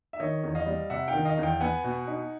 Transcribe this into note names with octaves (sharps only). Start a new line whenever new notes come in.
E5
D#3 C#5 D#5
E2
D#5 F5
G3
C3 E5 F#5
F5 G5
D#3
D#5 F5
E2
F5 G5
B3 F#5 G#5
B2
D#4